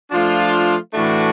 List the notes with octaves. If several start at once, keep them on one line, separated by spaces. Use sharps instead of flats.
F3 A3 D4 F4
A2 E3 A3 D4 F#4